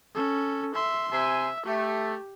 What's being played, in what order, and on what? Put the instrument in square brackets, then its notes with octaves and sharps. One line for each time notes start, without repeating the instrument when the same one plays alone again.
[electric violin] C#4 A4
E5 C6
[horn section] C3 G#5 C6 [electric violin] E5
[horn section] A3 [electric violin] G4